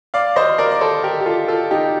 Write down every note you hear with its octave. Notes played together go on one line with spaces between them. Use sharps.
D5 F5
C5 D#5
A#4 D5
D5
A4 C5
G4 A#4
G4
F4 A4
F4 A4
D#4 G4